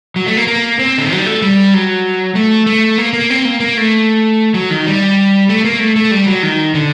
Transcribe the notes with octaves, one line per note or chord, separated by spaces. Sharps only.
F#3
A3
A#3
A#3
C4
D3
D#3
F#3
G3
A3
G3
F#3
A3
A3
A#3
A#3
C4
A#3
A#3
A3
F#3
D#3
G3
A3
A#3
A3
A3
G3
F#3
D#3
D3